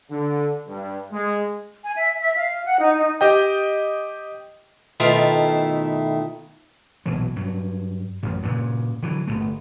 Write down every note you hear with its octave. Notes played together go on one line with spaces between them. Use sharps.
D3
G2
G#3
G#5
E5
E5
F5
F#5
D#4
D#4
G4 D#5 G5
B2 D#3 A3 E4 F4 A4
A#1 B2 E3 F#3
G2 F#3
A1 F#2
G2 A#2 C#3
D3 E3 F#3
G1 F2 A3